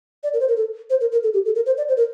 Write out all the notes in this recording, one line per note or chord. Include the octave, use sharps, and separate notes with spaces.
D5
A#4
C5
A#4
A4
C5
A#4
A#4
A4
G4
A4
A#4
C5
D5
C5
A#4